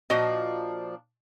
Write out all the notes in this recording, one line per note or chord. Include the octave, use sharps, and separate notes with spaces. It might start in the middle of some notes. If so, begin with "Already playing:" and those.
A#2 F3 D4 F#4 D#5